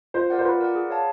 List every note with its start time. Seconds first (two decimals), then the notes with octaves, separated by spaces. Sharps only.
0.14 F4 C5
0.30 A#4 D5 F#5
0.38 C5
0.45 F4 B4
0.61 A#4 D5 F#5
0.75 G#4
0.90 C#5 F5 A5